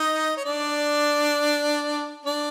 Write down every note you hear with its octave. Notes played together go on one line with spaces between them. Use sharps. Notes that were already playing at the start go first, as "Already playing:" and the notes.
Already playing: D#4 D#5
C#5
D4 D5
D4 D5